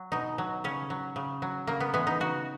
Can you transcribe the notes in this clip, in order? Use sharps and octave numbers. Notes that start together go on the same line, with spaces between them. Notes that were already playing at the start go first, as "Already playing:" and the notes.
Already playing: F#3
B2 D#4
F#3
C#3 C#4
F#3
C#3
F#3
C#3 A#3
B3
E3 G#3 B3
D#4
C#3 F#4